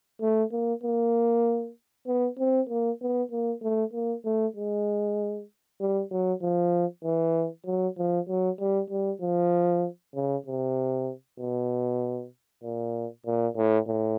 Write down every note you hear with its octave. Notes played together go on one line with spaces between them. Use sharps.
A3
A#3
A#3
B3
C4
A#3
B3
A#3
A3
A#3
A3
G#3
G3
F#3
F3
E3
F#3
F3
F#3
G3
G3
F3
C#3
C3
B2
A#2
A#2
A2
A2